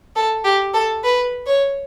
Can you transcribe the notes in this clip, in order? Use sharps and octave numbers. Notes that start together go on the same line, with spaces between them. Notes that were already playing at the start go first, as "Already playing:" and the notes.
A4
G4
A4
B4
C#5